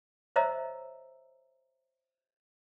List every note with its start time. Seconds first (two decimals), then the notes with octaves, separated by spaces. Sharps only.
0.36 C5 C#5 D#5 E5 A#5 E6